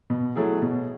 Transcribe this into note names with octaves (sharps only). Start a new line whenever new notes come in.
B2
F#3 A3 E4 G#4
B2